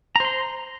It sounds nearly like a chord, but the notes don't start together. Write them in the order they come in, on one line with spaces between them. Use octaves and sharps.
A#5 C5 C6